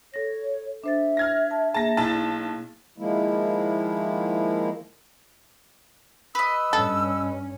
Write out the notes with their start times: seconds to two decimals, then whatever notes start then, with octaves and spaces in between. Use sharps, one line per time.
0.14 A4 C#5 A#6
0.84 D4 C5 E5 A6
1.17 F6 G#6 A#6
1.51 A5
1.74 A#3 G#4 A5 A#6
1.97 B1 E4 A5 A6
2.98 D#3 F3 G#3 A#3 E4
6.35 B4 D#5 E6
6.73 G2 C#4 A4